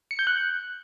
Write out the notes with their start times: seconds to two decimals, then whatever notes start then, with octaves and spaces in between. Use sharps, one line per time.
0.11 C#7
0.19 G6
0.27 F#6